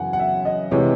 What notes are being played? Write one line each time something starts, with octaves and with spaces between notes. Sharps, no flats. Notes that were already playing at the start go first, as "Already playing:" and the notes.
Already playing: F#2 C#3 E3 F#5 G#5
F#5
E5
D#5
C3 E3 G#3 C#5